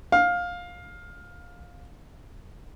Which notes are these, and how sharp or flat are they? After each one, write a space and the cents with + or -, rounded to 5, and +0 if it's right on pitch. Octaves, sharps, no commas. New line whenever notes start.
F5 +15